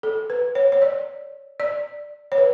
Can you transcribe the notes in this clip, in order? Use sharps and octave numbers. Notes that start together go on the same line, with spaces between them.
A4
B4
C#5
C#5
D5
D5
C#5
B4